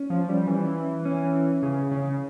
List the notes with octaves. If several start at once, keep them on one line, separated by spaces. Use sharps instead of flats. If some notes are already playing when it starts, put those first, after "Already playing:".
Already playing: C#4
F3
G3
E3
C#4
C#3
C#3